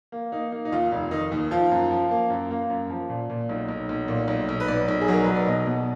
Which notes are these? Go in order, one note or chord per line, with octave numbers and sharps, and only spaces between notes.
A#3
A#3 D#4
A#3
D#4
D#2 F4
F1
D#3 D#4
D#2
F3 F4
F#2
F3
A#3
F#2
A#3
F#2
F3
A#2
A#2
B1
B1
B1
A#2
B1
B1
B4
B1 D5
B1
G#4
F#3 A#4
B1 B4
D5
B2 D#5
B2